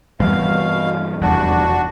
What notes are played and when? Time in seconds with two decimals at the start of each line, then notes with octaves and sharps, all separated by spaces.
0.20 G2 B2 E3 G3 F5
1.22 F1 E2 G2 D4 F#4